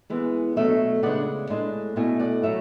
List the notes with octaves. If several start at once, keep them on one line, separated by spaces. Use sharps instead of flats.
E3 G#3 B3
B2 F#3 A3 D4 C#5 E5
C#3 G#3 B3 D4 D5 F#5
A2 G#3 D4
B2 A3 E4 E5 G#5
D5 F#5
A2 F#3 A3 C#5 E5